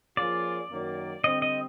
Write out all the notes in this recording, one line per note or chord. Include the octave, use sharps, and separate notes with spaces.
F3 A#3 C#4 F4 G#4 D5
F#2 D#3 F#3 A#3
D3 G3 C4 D#5
D#5